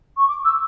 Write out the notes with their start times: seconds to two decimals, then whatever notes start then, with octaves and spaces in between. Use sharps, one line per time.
0.17 C#6
0.28 D6
0.45 E6